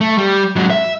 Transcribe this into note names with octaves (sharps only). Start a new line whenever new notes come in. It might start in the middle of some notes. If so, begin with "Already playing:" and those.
A3
G3
G#2 F#3
E5